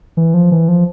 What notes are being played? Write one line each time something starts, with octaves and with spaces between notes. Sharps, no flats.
E3
F3
E3
F3